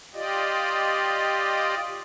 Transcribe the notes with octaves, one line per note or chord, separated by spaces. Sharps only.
F4 G4 D5 D#5